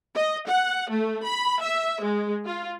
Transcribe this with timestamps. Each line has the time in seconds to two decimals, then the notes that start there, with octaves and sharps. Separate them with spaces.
0.16 D#5
0.47 F#5
0.89 A3
1.24 B5
1.61 E5
2.03 G#3
2.45 F4